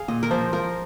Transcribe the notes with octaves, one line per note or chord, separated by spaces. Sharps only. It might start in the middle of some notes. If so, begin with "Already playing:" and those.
Already playing: G#4 F5
A#2 D#5
A#4
F3 C5
F3 A#4